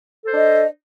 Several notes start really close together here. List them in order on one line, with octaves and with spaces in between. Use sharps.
A4 C5 D4 D#5